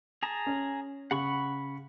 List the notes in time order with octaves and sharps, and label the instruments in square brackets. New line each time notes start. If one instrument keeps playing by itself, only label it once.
[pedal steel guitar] G#4 A5 A#5
[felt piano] C#4
[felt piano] C#3 [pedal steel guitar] F#5 B5 C#6